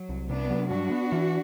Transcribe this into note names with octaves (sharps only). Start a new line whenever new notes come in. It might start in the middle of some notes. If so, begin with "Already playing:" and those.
Already playing: F#3
C2
C3 B3 D4
F#3
G2 D4 F#4
B3
E3